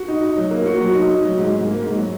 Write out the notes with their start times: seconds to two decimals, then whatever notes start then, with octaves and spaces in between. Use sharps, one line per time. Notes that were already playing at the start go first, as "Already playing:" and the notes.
Already playing: F#4
0.08 D#4
0.23 D#4
0.37 F#3
0.51 A#3
0.66 F#4
0.80 F#3
0.94 D#4
1.09 D#4
1.24 F#3
1.38 G#2
1.53 G#2
1.67 A#3
1.82 G#2
1.96 F#3